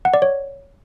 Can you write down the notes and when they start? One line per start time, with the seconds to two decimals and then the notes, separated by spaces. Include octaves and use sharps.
0.05 F#5
0.14 D5
0.22 C#5